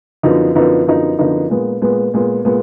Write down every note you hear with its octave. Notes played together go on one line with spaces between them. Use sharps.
F#2 D3 F3 B3 D#4
F#2 D3 F3 B3 D#4
F#2 D3 F3 B3 D#4
F#2 D3 F3 B3 D#4
A#2 G#3 B3
A#2 G#3 B3
A#2 G#3 B3
A#2 G#3 B3